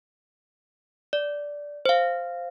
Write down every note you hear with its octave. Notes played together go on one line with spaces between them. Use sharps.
D5
C5 F5